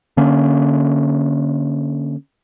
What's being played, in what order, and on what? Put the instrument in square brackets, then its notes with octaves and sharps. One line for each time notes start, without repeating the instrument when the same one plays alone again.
[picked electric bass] D3 A#3 C#4